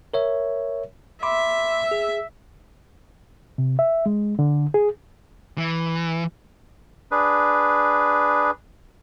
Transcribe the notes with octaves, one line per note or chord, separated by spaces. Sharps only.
A#4 C#5 E5
E5 B5 C6 D6
G#4
C3
E5
G#3
D3
G#4
E3
D4 G#4 B4